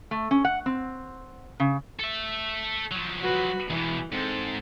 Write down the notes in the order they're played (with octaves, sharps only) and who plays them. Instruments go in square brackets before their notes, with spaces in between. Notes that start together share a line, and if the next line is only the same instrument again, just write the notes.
[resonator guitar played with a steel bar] A3
C#4
F#5
C4
C#3
[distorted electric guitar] A4 E5
F3 F#3
[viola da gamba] F#4 B4
[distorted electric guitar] E2 B2 [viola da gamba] E3
[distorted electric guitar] G#2 [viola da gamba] C4 A4